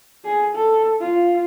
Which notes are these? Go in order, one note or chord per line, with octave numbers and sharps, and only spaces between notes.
G#4
A4
F4